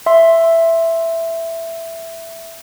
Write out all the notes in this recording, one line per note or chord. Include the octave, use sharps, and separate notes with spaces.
E5 C6